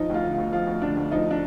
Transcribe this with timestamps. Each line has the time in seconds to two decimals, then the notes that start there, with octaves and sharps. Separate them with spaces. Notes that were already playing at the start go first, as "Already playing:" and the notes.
Already playing: F3 D#4
0.09 D2 F4
0.24 D3
0.33 F4
0.38 D2
0.53 F3 F4
0.67 D2
0.82 D3 D4
0.97 D2
1.12 F3 D#4
1.31 D4